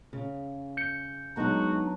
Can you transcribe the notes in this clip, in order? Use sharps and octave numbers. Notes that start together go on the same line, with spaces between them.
C#3
G6 C#7
F#3 G#3 B3 D4 D#4 F#4